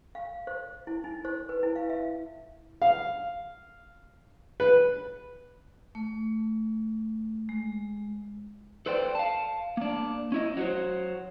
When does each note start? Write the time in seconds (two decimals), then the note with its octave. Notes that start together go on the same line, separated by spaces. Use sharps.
0.15 F5
0.47 C5
0.87 E4
1.04 D#4
1.25 C5
1.49 B4
1.63 E4
1.76 F5
1.90 E5
2.82 F5
4.60 B4
5.95 A3
7.49 G#3
8.86 A4 B4 C5 D5 G5
9.15 F5 A5
9.77 A#3 D4
10.32 C#4 E4 D#5
10.57 F#3 F#4 C5